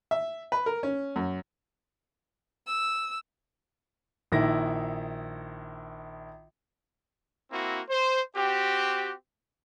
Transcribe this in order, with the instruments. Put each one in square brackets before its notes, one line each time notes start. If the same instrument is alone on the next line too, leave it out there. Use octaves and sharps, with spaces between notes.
[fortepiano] E5
B4
A#4
C#4
F#2
[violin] E6
[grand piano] A#1 D#3 E4 A#6
[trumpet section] A#3 C4 E4 F#4
C5
C4 F#4 G4